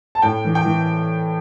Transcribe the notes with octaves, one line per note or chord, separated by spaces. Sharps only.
A5
A2 G5
E3
G5
E3